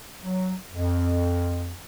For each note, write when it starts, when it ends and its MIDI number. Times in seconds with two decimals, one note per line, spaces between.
0.23 0.53 54
0.73 1.74 41